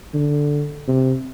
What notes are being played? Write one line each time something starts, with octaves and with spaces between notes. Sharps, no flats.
D3
C3